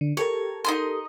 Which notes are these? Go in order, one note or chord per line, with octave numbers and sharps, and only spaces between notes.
D3
G4 A4 A#4 C#5
D#4 D#5 C6